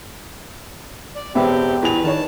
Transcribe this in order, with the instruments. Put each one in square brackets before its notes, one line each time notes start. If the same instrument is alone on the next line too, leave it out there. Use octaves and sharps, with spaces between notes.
[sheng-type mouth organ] D5
[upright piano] E1 B3 E5 [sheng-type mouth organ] C4 G4
[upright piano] E2 F7 [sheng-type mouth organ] B4
[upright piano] D#3 C#5 [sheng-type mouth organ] A5